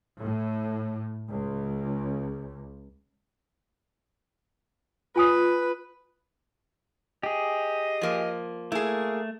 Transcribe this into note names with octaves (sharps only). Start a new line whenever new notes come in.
A2
C#2
F4 B4 G#5 D#6
G4 G#4 D#5
F3 A#3
A3 A#3 E4 G#4